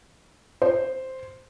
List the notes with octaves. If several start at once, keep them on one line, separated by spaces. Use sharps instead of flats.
C5